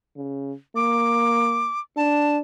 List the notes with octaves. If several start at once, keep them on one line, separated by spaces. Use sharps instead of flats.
C#3
A#3 D6
D4 A5